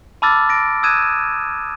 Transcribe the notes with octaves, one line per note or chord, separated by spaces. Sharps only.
A5 B5 D6 E6 F6 A6
A#6 D7
D#6 E6 F#6 G#6 D#7 E7